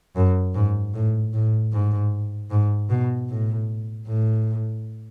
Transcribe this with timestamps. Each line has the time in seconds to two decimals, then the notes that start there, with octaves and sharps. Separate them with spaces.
0.16 F#2
0.55 G#2
0.94 A2
1.33 A2
1.72 G#2
2.51 G#2
2.89 B2
3.29 A2
4.07 A2